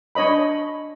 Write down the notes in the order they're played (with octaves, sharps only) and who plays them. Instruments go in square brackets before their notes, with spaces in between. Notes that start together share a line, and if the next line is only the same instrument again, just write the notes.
[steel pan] D4 C#5 D#5 B5